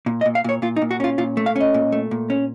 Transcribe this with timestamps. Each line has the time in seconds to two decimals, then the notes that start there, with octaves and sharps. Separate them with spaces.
0.06 A#2
0.21 D#5
0.25 A#2
0.35 F5
0.44 A#2 C#5
0.62 A#2 F4
0.76 D#4
0.82 A#2
0.91 F#4
1.00 C#4 F4
1.18 A#2 F4
1.37 A3
1.46 F5
1.56 C#4 D#5
1.74 A#2
1.92 A3
2.11 A#2
2.30 C#4